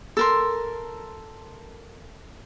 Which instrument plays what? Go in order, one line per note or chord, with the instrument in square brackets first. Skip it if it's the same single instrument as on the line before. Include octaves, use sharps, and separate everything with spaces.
[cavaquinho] A4 A#4 C6